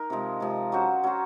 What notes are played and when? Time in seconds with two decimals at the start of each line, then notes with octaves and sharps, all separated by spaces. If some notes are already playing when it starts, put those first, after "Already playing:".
Already playing: D#4 A#4
0.10 C3 F3 G#3
0.40 C3 F3 G#3
0.72 F#3 C#4 F#4 C5
1.04 F#3 C#4 F#4 C5